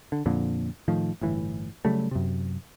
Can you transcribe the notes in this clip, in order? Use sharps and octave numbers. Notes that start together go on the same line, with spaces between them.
D3
F2 A#2 D3
A2 D#3 F3
G1 A2 E3
C#3 F#3 G3 A3
F#2 C3